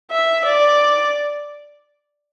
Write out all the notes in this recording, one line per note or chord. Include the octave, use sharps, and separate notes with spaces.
E5
D5